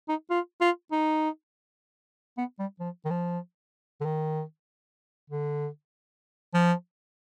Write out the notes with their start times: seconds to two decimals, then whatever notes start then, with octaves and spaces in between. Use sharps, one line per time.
0.09 D#4
0.30 F4
0.61 F4
0.92 D#4
2.38 B3
2.59 G3
2.80 F3
3.05 D#3
3.10 F3
4.01 D3
4.05 D#3
5.30 D3
6.54 F3